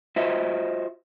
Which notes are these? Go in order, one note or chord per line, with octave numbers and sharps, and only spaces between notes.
F4 F#4 C5 D#5 E5